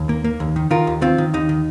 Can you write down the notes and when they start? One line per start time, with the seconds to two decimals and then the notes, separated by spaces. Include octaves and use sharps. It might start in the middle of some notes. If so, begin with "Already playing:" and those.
Already playing: D#2
0.09 A#3
0.24 A#3
0.40 D#2
0.56 D#3
0.71 D#3 F4 A#4
0.87 D#2
1.02 D#3 C4 F4
1.18 D#3
1.34 D#2 D#4
1.49 D#3